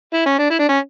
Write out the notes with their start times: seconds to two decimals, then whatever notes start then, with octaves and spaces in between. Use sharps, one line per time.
0.14 E4
0.26 C#4
0.38 D4
0.50 E4
0.59 D4
0.69 C#4